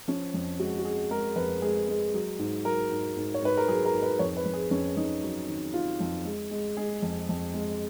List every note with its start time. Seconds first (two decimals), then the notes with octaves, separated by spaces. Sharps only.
0.08 F3 C#4
0.34 F2
0.59 G#3 F#4
0.79 F#4
0.85 G#3 G#4
1.11 G#3 A#4
1.36 F2 B4
1.62 G#3 G#4
1.88 G#3
2.14 F#3
2.39 G#2
2.65 F#3 A#4
2.91 G#2
3.16 G#2
3.34 C#5
3.42 G#2 B4
3.57 A#4
3.68 F#3 G#4
3.85 A#4
3.93 G#2
4.02 B4
4.19 F2 C#5
4.37 B4
4.45 F2
4.53 G#4
4.71 F2 C#4
4.97 F2 D#4
5.23 F#3
5.48 D#3
5.74 D#3 F4
6.00 F2
6.25 G#3
6.51 G#3
6.77 G#3 G#4
7.02 F2
7.29 F2
7.54 G#3